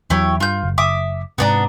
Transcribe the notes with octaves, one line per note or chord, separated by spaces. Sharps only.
E2 F#3 E4 G4 C#5
G2 F4 G6
F#1
F#1 E5 D6 D#6
G#2 C3 B3 D4 A#5